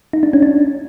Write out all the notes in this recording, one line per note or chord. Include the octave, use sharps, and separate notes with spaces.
D#4
D4
C#4
D4